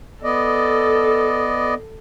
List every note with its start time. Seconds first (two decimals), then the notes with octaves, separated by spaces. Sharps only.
0.23 B3 A4 D5 D#5